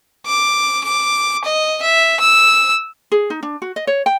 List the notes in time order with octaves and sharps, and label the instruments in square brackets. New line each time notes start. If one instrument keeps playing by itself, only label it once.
[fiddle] D6
D6
D#5
E5
E6
[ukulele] G#4
D#4
D4
F#4
D#5
C#5
G5